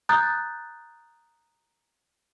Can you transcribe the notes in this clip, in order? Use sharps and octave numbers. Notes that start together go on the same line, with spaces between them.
A#5 D#6 F#6 G6 A6